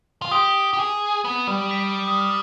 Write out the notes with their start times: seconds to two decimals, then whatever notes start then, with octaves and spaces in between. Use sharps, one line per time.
0.22 F4
0.31 G4 D#6
0.73 G4
0.79 G#4
1.25 B3
1.47 G3
1.71 B6
2.08 D#6
2.18 F6